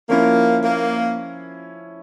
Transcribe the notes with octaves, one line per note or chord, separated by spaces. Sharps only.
F3 A#3 C#4 E4
A#3